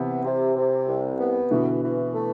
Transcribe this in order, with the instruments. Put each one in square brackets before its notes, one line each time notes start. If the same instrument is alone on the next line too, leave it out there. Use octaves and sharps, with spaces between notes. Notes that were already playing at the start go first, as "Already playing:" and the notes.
Already playing: [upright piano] C3 E3 [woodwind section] B3
[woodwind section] C3
C3
C2
B3
[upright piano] B2 D3 [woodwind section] E3
[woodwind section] E3
A3